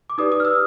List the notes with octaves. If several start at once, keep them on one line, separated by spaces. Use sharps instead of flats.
D6
D#4 G4 B4 D5 D#6
D#6
F6
E6